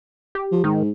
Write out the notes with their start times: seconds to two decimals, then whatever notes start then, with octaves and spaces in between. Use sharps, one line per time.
0.35 G4
0.52 F3
0.64 G#2 D#3